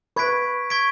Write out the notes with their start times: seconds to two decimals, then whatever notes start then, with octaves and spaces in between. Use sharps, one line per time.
0.16 B4 C#6 G#6 B6 D7
0.70 C#6 G#6 B6 D7